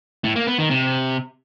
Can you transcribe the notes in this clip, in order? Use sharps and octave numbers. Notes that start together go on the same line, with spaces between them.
A2
A#3
B3
D#3
C3